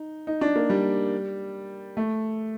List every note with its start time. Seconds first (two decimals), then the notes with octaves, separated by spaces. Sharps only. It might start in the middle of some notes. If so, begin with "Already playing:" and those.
Already playing: D#4
0.27 D#4
0.41 D4
0.56 A#3
0.70 G3
1.97 A3